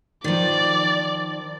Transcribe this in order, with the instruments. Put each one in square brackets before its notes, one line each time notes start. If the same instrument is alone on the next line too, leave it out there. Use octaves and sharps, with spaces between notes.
[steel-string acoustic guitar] D#3 F3 [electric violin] D5